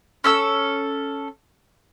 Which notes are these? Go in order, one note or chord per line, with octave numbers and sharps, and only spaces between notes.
C#4 A4 E6